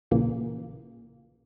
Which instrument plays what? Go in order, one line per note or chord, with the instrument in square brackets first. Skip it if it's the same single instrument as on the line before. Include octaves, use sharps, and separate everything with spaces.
[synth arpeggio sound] A#1 A#2 C#3 E3 A#3